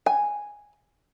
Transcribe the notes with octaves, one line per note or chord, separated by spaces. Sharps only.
G#5